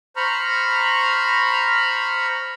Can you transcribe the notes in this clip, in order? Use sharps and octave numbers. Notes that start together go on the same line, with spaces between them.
C5 A#5 B5 C#6 F6